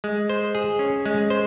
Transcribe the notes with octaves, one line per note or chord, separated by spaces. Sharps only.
G#3
C5
G#4
C#4
G#3
C5